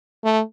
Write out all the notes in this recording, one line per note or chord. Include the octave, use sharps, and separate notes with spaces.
A3